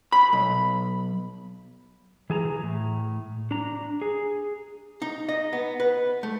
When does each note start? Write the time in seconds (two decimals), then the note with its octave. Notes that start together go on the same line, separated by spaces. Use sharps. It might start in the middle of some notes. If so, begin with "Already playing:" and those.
0.12 B5
0.33 B1
2.30 E3 G#4 A5 A#5
2.63 A2
3.51 D4 A#5
4.01 G#4
5.02 D#4
5.29 D#5
5.53 B3
5.80 B4
6.23 A3